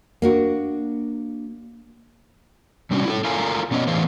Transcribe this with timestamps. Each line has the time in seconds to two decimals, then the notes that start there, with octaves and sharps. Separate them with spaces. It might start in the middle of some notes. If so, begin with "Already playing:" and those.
0.22 A#3 D4 F#4
2.91 C3 G3 C#4 D4 E4 F#4
3.05 E4 G#4 A4
3.25 F4 A4 A#4 F5 G#5 A#5
3.71 B2 B3 C#4 D4 D#5
3.88 A2 E3 G#4 C5 F5